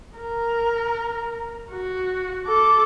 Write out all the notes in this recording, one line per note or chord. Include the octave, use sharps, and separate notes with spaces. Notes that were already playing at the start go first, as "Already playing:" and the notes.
A#4
F#4
A4 D6